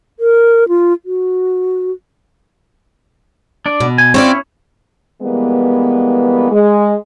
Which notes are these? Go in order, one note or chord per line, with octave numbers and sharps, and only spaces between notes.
A#4
F4
F#4
D4 D5
B2
G#5
C4 C#4 E4 F4 C#5 D5
E3 G3 G#3 A#3 B3
G#3